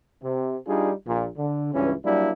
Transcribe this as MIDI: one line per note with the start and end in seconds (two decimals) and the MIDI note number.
0.21 0.57 48
0.66 0.90 55
0.66 0.90 62
0.66 0.90 63
0.66 0.90 65
0.66 0.90 68
1.06 1.27 34
1.06 1.27 46
1.36 1.69 50
1.72 1.92 37
1.72 1.92 43
1.72 1.92 52
1.72 1.92 61
2.03 2.30 54
2.03 2.30 55
2.03 2.30 58
2.03 2.30 62
2.03 2.30 64